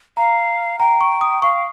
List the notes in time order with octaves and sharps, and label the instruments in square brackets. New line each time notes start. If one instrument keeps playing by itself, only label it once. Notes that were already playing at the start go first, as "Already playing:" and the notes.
[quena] F5 [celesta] A#5
[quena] G5 [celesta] A#5
[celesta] C#6
D#6
[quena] F5 [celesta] C#6